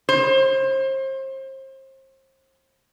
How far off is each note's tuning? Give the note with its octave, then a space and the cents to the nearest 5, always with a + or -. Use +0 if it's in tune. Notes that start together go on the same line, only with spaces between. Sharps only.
C5 +35